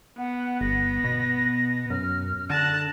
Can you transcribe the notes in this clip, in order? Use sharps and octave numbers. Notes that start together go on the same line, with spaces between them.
B3 F#5
G1 A#6
B2
F#2 F6
D3 A5 F#6 A#6